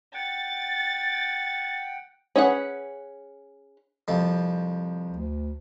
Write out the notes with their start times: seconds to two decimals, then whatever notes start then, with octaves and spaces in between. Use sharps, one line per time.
0.14 F#5 G5 A6
2.36 C#4 G#4 B4 F#5
4.08 C2 F2 F3
5.10 D2